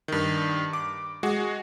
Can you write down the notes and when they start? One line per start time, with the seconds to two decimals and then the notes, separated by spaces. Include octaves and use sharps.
0.08 G2 D#3
0.73 D6
1.23 G#3 F#4